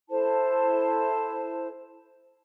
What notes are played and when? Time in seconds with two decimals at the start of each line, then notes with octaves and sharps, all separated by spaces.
0.10 E4 A4 C5 A5